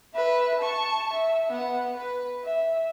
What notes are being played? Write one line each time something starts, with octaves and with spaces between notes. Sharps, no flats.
B4 E5
A5 C#6
E5
B3 F#5
B4
E5